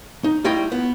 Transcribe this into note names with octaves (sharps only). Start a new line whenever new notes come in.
D#4
G3 A3 E4 F4 D#5 G5
B3